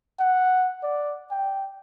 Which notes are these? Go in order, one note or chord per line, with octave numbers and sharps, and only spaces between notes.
F#5
D5
G5